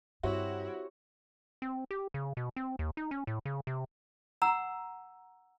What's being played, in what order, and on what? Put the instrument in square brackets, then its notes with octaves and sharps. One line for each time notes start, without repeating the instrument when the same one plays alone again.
[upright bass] G2 [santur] C4 G4 C#5 [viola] E4 [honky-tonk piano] F#4
[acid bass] C4
G4
C#3
B2
C4
D#2
D#4
C#4
A2
C#3
C3
[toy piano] F#5 A#5 E6